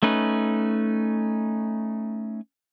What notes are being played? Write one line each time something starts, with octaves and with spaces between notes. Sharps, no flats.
A3 C#4 D#4 B4